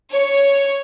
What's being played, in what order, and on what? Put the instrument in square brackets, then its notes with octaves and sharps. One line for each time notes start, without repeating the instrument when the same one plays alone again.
[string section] C#5